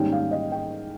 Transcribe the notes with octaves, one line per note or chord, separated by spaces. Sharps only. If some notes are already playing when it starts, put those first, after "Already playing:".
Already playing: G#2 D#3 G3 A#3 C#4 G5
F5
D#5
G5